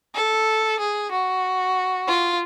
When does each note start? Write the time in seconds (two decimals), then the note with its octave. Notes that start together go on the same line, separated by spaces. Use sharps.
0.14 A4
0.79 G#4
1.11 F#4
2.07 F4